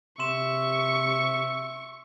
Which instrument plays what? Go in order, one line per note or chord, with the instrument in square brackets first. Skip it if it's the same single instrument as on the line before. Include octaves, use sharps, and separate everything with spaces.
[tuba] C3 [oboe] E5 [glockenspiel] C6 E7 [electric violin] C#6